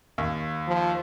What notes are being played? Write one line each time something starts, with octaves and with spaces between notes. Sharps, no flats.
D#2
F3